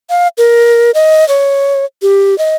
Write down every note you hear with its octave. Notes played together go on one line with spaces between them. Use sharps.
F5
A#4
D#5
C#5
G4
D#5